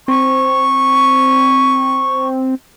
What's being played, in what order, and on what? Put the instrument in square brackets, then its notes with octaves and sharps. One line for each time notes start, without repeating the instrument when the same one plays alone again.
[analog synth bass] C4 [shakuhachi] C#6